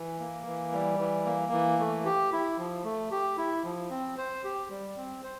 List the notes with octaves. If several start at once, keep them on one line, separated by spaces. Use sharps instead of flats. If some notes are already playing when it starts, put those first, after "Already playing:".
Already playing: E3
A#3
E3
G3
E3
A#3
E3
A3
G4
E4
F3
A3
G4
E4
F3
C4
C5
G4
G3
C4
C5